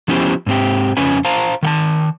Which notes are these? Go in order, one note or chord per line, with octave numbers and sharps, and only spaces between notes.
F3 B3 C#4 E4 G4 C5
G#2 C4 G4
F2 C#3 C#4 B4 C#5 G#5
C5 F5 A5 A#5
D#3 F#5 A5